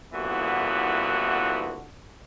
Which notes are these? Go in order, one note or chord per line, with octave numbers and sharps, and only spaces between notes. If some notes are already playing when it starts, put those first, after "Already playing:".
C2 A#2 D3 E3 B3 F#4